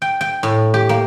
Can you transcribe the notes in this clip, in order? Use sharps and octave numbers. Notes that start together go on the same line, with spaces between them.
G5
G5
A2
G4
A#3